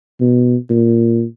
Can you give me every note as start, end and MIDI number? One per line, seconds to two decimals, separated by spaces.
0.21 0.56 47
0.70 1.24 46